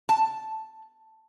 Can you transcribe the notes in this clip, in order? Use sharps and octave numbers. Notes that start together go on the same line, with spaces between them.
A5